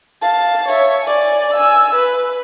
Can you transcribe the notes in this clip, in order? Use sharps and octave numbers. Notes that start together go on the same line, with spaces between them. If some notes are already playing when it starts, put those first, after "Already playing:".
F5 A5
C#5 E5
D5 G#5
G#5 E6
B4